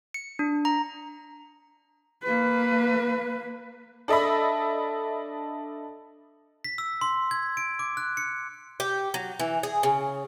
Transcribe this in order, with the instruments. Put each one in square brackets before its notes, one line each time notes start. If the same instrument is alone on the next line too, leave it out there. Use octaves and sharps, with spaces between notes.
[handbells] C#7
D4
A#5
[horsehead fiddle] A#3 B4
[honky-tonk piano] D4 A4 D#5 E5 B5
[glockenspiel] B6
E6
C6
G#6
D7
D6
F#6
C#7
[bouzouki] G4
F#3
E3
G#4
C#3